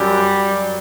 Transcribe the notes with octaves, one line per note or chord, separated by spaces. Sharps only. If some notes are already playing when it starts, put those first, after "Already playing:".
Already playing: F#2 F#3 G3
F#2 F#3